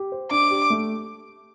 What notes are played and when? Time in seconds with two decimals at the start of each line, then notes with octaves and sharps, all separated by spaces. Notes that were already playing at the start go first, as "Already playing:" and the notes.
Already playing: G4
0.12 C5
0.31 D4 D6
0.50 G4
0.70 A3